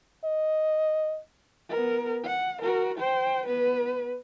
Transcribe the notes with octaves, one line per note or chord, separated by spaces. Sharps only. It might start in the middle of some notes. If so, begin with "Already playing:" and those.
D#5
B3 A#4
F#5
F#4 A#4
C5 G5
B3 B4